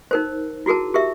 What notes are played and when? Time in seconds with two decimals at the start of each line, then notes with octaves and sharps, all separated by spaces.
0.11 D#4 A#4 C5
0.66 E4 F#4 G#4 A#4 A5
0.94 G4 A#4 E5